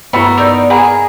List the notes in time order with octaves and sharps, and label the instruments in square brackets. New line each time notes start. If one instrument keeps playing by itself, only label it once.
[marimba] G2 E4 [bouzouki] A3 F#4 A#4 [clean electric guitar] B3
[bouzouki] D#4 A#4 D5 [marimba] E6 G6
[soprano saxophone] G#4 [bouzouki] A#4 [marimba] F#5 B5